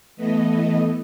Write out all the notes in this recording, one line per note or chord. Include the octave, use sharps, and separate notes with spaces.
E3 A3 B3 D#5